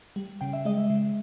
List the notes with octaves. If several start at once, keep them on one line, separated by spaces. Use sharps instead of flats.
G3
C#3 G5
E5
G#3 D#5
E5
C#3